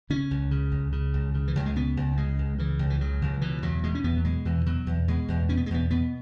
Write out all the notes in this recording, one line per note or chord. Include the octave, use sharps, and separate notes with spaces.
C#3 C#4
C#2
C#3
C#2
C#3
C#2
C#3
E3
C#2 F#3
G#3
C#3 B3
C#2
C#3 G#3
C#2
C#3 E3
C#2
E3
C#3 F#3
C#2
B2 E3
E2 F#3
B2 G#3
C#4
E2 B3
F#3
B2 G#3
E2 E3
B2 F#3
E2
B2 G#3
E2
B2 C#4
B3
G#3
E2 B3
B2 B3